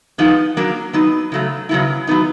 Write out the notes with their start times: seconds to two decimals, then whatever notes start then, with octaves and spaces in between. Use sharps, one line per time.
0.18 F3 G#3 B3 D#4
0.57 F#3 A#3 D4
0.93 F#3 B3 D#4
1.32 C#3 F#3 A3
1.69 C#3 F#3 B3 E4
2.07 F#3 B3 D#4